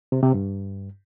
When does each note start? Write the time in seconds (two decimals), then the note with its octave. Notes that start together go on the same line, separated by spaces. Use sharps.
0.12 C3
0.23 C3
0.34 G2